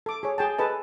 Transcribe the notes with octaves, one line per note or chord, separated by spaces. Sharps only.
A4 D6
G#4 C#5
G#4 G5 A5
G#4 A4 B4 D#5 A5